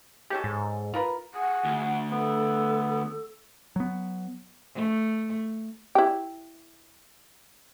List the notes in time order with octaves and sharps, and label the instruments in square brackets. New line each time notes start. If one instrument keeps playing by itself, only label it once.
[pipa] G#3 C#4 A4 [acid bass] G4
[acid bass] G#2
[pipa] F4 A#4 B4
[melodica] G#4 [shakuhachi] F#5
[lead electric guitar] D2
[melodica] B3 [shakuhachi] A4
[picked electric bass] F#3 B3
[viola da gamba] A3
[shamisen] E4 G4